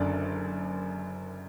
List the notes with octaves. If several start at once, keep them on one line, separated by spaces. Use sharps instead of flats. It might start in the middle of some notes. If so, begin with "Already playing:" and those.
Already playing: F#1 F#2 D3 D5